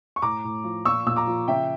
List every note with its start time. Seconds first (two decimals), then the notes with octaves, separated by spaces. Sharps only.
0.16 C#6
0.22 A2 A#5 D6
0.44 A2
0.64 F3
0.85 A#2 C#6 E6
1.06 A#2 E6
1.16 A#5 D6
1.27 F3
1.48 C#3 E5 G5